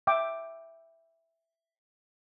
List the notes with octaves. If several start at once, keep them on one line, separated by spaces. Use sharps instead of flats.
E5 G5 D6